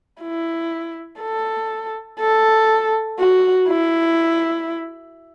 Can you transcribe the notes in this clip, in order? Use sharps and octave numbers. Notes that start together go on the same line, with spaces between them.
E4
A4
A4
F#4
E4